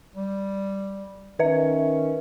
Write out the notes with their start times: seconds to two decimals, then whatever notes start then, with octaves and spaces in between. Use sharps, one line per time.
0.15 G3
1.39 D#3 C#4 B4 E5